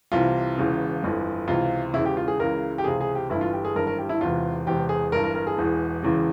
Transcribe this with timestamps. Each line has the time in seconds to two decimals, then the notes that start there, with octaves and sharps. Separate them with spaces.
0.12 C2 C3 E3 F4
0.57 E1 E2 C#3 E3
1.03 G1 F2 E3
1.48 C#2 C3 E3 F4
1.94 E1 E2 C#3 E3 E4
2.05 G4
2.17 F4
2.28 G#4
2.39 C#2 C#3 E3 A#4
2.78 G4
2.84 C#2 C3 E3 G#4
3.01 G#4
3.15 G4
3.30 G1 G2 E3 E4
3.41 F4
3.53 G4
3.65 G#4
3.75 G#1 G2 E3 A#4
3.87 A#4
3.98 G4
4.09 E4
4.21 E1 E2 C3 E3 F4
4.66 E1 E2 C3 E3 G4
4.89 G#4
5.12 G1 G2 E3 A#4
5.24 A#4
5.35 A#4
5.47 G#4
5.58 E1 E2 E3
6.03 E1 E2 C#3 E3